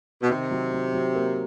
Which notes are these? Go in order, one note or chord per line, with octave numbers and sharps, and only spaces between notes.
B2
C3 D#3
F#3
F#3
F#3
A#3